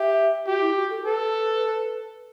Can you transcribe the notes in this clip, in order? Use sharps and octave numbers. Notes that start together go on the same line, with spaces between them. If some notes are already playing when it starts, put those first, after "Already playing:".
Already playing: G4 E5
F#4 G4
E4
F#4
A4
A4 B4